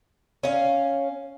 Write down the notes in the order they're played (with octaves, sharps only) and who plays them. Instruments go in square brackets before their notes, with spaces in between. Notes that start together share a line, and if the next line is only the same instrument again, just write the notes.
[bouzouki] C#4 F5